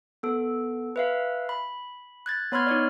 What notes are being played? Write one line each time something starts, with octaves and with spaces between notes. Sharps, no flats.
B3 A4
B4 E5 F5
B5
F#6 G#6 A6
B3 C#5 B5 C6 F6 G#6
D#4 C#5 D5